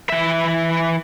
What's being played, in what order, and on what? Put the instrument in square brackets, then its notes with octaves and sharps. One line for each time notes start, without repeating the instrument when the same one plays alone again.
[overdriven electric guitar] E3 E5